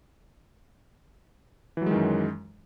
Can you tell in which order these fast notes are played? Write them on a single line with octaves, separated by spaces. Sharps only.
E3 F#3 G#3 D#3 F#2